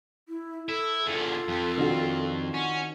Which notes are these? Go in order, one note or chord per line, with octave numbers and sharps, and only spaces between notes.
E4
E4 A4
E2 D3 F4 A4
F2
D#3 D4 F#4
C#4 F#5